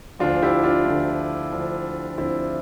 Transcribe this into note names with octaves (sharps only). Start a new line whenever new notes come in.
D2 D3 F3 D4 F4
E4 G4
D4 F4
D2 D3 F3
D2 D3 F3
D2 D3 F3 C4 E4